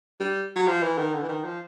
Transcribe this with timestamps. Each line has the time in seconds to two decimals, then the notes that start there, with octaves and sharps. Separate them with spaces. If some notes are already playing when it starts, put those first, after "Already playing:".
0.20 G3
0.56 F#3
0.67 F3
0.83 E3
0.98 D#3
1.14 D3
1.22 E3
1.29 D#3
1.45 F3